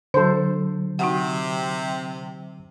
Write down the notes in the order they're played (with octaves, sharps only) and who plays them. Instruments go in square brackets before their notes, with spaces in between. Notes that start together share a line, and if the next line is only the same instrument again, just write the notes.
[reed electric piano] D3 F#3 [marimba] D4 [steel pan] A4 C5
[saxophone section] C3 [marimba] D#4 F#4 F#5